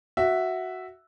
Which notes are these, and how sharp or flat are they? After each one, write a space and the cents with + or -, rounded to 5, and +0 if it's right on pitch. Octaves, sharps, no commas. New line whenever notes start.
F#4 +0 E5 +0